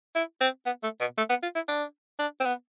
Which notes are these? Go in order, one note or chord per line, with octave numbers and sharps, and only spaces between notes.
E4
C4
B3
A3
B2
A3
B3
F4
E4
D4
D4
C4
B3